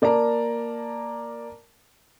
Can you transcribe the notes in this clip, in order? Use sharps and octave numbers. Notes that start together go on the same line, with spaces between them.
A#3 D5 A5 A#5